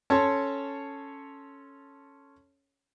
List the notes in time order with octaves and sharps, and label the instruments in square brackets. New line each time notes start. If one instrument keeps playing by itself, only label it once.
[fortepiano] C#4 A4 C#5 [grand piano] A5 C6